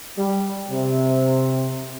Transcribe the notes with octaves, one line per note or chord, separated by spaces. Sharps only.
G3
C3